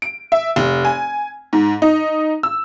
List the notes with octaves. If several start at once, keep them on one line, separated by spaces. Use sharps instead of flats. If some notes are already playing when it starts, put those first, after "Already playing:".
D7
E5
F1
G#5
G#2
D#4
E6